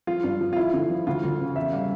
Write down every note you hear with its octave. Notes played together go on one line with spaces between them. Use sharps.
F3 F4
G2
F3
F4
F3 E4
D3
F3
D2 F4
D2
C#3
E2 E5
G3 F5